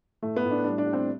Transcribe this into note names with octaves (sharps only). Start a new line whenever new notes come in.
A2 A3
B3
A2
D4
G3 D4
D4
G3
C4